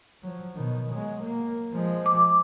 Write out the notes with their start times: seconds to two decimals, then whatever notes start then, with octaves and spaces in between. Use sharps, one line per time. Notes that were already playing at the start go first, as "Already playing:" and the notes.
0.23 F3 F#3
0.55 B2 D#3
0.93 F#3 G#3
1.24 A#3
1.73 F3 G#3
2.06 D6